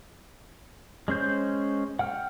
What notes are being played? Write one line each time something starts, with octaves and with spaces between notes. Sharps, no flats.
G#3 C#4 C5 G6
F#5 G5 F6